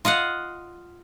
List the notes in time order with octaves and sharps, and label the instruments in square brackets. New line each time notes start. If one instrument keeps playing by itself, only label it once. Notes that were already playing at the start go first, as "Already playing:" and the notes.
[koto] F4 D#5 F5 F#5